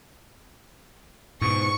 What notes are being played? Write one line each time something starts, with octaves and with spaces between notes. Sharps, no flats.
G#2 B2 C#6